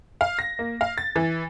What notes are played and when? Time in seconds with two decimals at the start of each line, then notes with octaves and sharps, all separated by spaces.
0.21 F5
0.39 A#6
0.59 A#3
0.81 F5
0.98 A6
1.16 E3